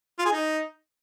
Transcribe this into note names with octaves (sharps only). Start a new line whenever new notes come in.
F4
G#4
D#4